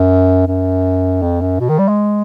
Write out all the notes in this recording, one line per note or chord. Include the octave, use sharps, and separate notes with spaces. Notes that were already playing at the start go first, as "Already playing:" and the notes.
Already playing: F#2
F#2
F2
F#2
B2
D#3
G3
G#3